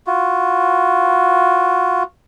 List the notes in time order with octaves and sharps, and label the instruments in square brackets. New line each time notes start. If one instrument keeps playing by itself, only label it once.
[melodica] F4 F#4